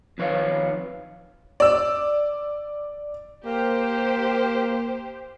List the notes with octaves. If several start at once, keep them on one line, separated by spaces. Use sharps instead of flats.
F2 D#3 B4 C#5 F5
D5 E6
A#3 G4 C5